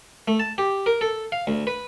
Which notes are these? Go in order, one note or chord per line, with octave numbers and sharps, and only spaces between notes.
A3
A5
G4
A#4
A4
F5
D2
B4